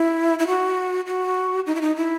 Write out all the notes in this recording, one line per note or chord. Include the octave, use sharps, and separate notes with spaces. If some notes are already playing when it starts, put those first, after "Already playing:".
Already playing: E4
E4
F#4
F#4
D#4
E4
D#4
E4